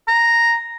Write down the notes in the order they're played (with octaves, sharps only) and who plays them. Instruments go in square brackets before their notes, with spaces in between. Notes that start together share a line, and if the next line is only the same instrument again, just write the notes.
[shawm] A#5